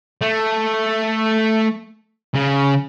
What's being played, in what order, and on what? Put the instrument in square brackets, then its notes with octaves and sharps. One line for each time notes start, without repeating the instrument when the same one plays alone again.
[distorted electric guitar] A3
C#3